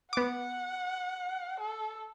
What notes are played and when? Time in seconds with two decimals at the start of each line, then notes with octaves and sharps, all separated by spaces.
0.13 B3 F#5 D6
1.60 A4